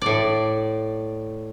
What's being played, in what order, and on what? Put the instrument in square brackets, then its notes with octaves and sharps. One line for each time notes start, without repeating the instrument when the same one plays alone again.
[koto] A2 D5